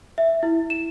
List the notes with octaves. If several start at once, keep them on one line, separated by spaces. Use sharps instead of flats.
E5
E4
E7